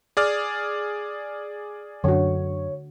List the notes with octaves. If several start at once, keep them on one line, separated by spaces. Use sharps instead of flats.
G#4 D5 F6
F#2 D3 F#4 C#5